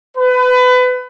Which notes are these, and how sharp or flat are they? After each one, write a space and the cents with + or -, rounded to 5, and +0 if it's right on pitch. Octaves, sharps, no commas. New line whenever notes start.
B4 +25